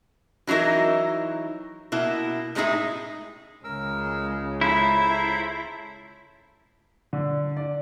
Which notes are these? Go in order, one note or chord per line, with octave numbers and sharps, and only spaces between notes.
E3 F#3 D#4 E4 A#4
B2 A#3 E4
A2 G#3 C4 D#4 G#4 E5
C#2 C#3 G#3 A#4 E6
E4 A4 C5 A#5
D3
D5